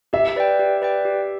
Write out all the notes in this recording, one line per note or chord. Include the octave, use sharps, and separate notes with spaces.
G4 E5
B4 D5 G5
G4
B4 D5 G5
G4